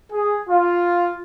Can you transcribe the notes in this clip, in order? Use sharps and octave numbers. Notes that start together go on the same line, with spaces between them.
G#4
F4